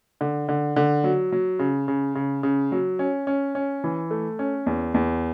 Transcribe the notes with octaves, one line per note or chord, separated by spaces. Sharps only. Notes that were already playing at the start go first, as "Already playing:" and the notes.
D3
D3
D3
F#3
F#3
C#3
C#3
C#3
C#3
F#3
C#4
C#4
C#4
E3
A3
C#4
E2
E2